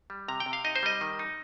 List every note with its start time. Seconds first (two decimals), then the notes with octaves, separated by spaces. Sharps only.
0.10 G3
0.28 C3 A#5
0.40 G5
0.46 C3
0.53 F5
0.65 D#4 D#5
0.76 C5
0.83 G3 D#5
1.01 D#3
1.19 D#4